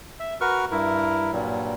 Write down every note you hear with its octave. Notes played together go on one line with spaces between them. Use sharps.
E5
F#4 A#4 B4 C#6 F6
G2 E4 A#4
G2 A#2 F#3 G3